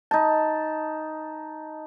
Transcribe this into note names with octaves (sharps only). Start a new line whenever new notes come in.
D#4 A5